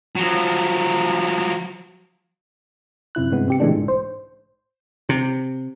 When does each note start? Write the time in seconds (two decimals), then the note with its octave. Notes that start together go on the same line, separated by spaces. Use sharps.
0.16 F3 F#3
3.15 F#2 C3 E4 F#6
3.31 G2 C3 G#3 B3
3.48 C3 G4 C#7
3.60 A#2 C#3 E3 G#3 A3 D4
3.72 B1 G#2
3.88 C5
5.09 C3